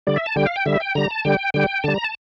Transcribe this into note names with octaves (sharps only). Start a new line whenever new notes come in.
D3 G3 D5
E5
A5
D3 G3 G5
F5
G5
D3 G3 E5
G5
D3 G3 A#5
A5
D3 G3 G5
D3 G3 G5
D3 G3 A5
A#5
A5